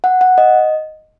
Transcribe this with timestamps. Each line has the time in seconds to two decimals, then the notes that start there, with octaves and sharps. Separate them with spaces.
0.04 F#5
0.21 F#5
0.38 D#5